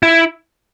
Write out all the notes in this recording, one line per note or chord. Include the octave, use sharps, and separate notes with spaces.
E4